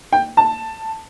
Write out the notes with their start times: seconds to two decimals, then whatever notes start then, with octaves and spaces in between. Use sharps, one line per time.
0.12 G5
0.37 A5